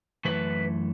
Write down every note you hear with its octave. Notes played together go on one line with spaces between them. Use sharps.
F#2 E3 A3 B4